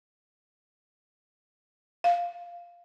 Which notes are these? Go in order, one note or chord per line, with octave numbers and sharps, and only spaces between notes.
F5